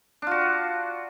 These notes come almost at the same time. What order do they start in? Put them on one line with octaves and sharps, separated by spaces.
D4 F4 F#4